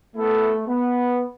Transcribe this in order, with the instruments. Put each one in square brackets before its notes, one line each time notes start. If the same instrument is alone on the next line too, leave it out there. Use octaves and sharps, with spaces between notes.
[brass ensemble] A3 [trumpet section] B3 E4 A4
[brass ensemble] B3